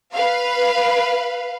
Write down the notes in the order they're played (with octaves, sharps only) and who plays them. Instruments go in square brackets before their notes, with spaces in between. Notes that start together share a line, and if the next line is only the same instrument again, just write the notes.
[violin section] B4 F5